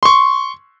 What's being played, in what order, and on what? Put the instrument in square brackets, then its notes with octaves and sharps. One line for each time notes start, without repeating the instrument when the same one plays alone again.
[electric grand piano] C6 C#6